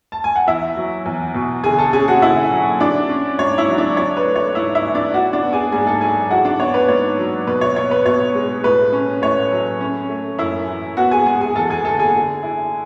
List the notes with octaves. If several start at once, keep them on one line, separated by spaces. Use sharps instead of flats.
A5
G#5
F#5
E2 E4 E5
F#3
E2
B2
D3 G#4 G#5
A4 A5
C#4 G#4 G#5
F#4 F#5
D3 E4 E5
F#3
D4 E4 D5
C#4
G#2 C#5
E4 E5
F#3
D4 D5
D4 C#5
B4
A3
C#5
G#2 E4 E5
E4 E5
E3
D4 D5
E4 F#4 F#5
D4 D5
B3
G#4 G#5
G#2 G#4 G#5
A4 A5
F#3 G#4 G#5
E4 F#4 F#5
D4 D5
B3 C#5
B4
G#2 C#5
F#3
B2 B4
C#5
B3 C#5
B4
B2 C#5
G#3
A2 B4
C#4
A2 C#5
F#3
C#4
A3
F#2 E4 E5
E3
B3 F#4 F#5
G#4 G#5
G#3 G#4 G#5
G#4 G#5
E2 A4 A5
G#4 G#5
D3 A4 A5
G#4 G#5
D3
E4